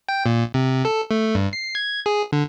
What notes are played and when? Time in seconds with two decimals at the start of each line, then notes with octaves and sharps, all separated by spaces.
0.09 G5
0.26 A#2
0.54 C3
0.85 A4
1.11 A3
1.35 G2
1.53 C7
1.75 G#6
2.06 G#4
2.32 D3